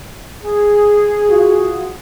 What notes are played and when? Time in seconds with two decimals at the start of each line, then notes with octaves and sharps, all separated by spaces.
0.41 G#4
1.30 F4 F#4